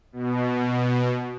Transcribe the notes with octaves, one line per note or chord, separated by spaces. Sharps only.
B2